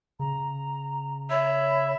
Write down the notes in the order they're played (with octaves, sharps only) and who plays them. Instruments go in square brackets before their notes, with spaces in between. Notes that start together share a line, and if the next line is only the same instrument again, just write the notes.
[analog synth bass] C#3 [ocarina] A#5
[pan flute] C#5 [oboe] E5 [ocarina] B5